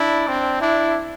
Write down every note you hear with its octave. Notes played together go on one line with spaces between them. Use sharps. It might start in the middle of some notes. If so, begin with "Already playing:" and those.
Already playing: D4 E4
C4
D4 E4